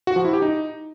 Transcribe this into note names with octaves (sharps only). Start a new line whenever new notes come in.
F#4
F3
E4
G4
D#4